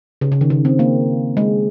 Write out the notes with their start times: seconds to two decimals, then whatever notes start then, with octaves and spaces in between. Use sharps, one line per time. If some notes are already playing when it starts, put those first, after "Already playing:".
0.21 C#3
0.32 C#3
0.41 D#3
0.50 C#3
0.65 C4
0.79 A#3
1.37 G#3